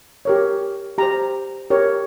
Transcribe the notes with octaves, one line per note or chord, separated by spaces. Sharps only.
G4 A#4 C#5
G4 C5 A#5
G4 A#4 C#5